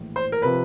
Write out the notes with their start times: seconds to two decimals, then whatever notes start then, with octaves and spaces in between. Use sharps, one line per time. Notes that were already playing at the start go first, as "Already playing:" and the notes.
Already playing: A#1 A2 E3
0.16 C5
0.32 A#4
0.42 C3 F3 B4